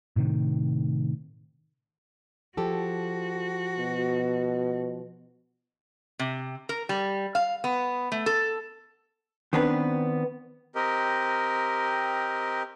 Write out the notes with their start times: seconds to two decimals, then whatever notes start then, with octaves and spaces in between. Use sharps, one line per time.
0.16 A2 C3 D#3
2.57 F3 F#4 G4 A4
3.78 B2
6.19 C3
6.69 A#4
6.89 G3
7.35 F5
7.64 B3
8.12 A3
8.26 A4
9.53 D#3 B3 C4 D4 B4
10.75 C4 G4 A#4 D#5